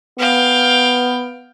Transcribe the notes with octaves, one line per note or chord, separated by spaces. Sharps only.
B3 F5 G5